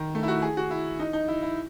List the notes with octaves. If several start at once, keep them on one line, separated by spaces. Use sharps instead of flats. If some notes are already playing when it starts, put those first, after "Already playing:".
Already playing: D#3
A3
E4
F#4
G#4
F#4
E4
D#4
D#4
E4
E4